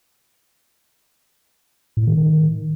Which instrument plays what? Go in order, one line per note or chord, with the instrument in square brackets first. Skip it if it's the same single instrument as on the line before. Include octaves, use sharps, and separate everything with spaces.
[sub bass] A2
D#3
D#3